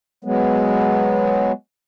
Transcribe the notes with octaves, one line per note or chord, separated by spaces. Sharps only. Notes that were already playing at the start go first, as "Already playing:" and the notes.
F#3 G#3 B3